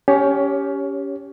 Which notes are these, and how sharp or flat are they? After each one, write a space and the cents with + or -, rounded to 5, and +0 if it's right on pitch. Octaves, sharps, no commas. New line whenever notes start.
C#4 +20 G4 +0 C#5 +0